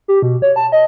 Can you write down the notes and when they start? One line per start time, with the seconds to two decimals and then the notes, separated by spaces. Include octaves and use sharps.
0.08 G4
0.22 B2
0.42 C#5
0.56 A5
0.72 D#5